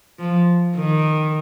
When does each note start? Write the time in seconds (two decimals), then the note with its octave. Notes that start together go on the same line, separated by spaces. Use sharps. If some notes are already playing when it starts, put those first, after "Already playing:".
0.19 F3
0.76 D#3